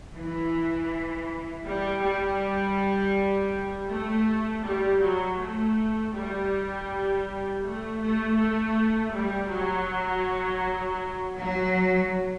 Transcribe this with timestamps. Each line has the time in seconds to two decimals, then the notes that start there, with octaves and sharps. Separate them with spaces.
0.16 E3
1.65 G3
2.03 G3
3.90 A3
4.65 G3
5.02 F#3
5.40 A3
6.14 G3
7.64 A3
8.01 A3
8.38 A3
9.13 G3
9.50 F#3
11.37 F#3